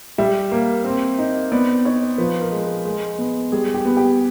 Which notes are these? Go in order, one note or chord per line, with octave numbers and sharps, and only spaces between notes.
G3 E5
A#3
C4
D#4
B3 D5
D#4 C#5
F3 B4
A#4
G#3
A#4
G#3
B3
G3 G#4
G4
B3
G4